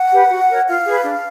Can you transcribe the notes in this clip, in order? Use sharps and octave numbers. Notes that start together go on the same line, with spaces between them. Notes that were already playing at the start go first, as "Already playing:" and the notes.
Already playing: F#5
G4 B4
F#4
A#4 C#5
F4 F5
G#4 B4
D4